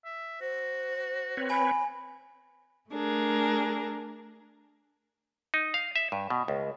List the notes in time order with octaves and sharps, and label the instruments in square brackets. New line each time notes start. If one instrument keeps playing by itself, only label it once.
[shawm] E5
[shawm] F#4 [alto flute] C5
[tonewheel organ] C4 B4 C#5
[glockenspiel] G#5 [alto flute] B5
[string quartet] A3 D4 G#4 A#4
[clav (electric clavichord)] D#4
F5
E5
G2
B2
C#2